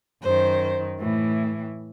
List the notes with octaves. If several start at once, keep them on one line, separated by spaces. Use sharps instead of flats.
F#2 D#3 C5
A2 E3